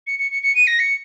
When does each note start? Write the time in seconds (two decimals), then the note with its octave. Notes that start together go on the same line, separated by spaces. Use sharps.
0.07 C#7
0.19 C#7
0.31 C#7
0.43 C#7
0.55 D#7
0.67 A#6
0.80 C#7